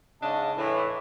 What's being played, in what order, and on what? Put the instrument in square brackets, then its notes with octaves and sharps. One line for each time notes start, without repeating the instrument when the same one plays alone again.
[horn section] G#2 C#3 C#4 D4 D#5 A5
A2 E3